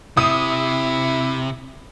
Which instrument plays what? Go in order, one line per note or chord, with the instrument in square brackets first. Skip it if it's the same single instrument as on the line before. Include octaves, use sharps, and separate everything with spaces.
[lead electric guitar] C3 [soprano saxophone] E4 [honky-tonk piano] D#6